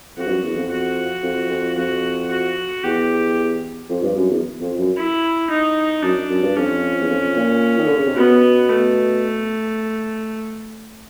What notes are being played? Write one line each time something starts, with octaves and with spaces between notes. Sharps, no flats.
F2 F#4
G2
F#2
E2
F2
F#4
F2
F2
F2 F#4
F#4
E2 G4
F2
G2
F#2
E2
F2
F#2
E4
D#4
F#2 D4
F#2
G2
F2 C#4
E2
F2
A#2
D#3
D3
C#3
C3
B2 B3
A3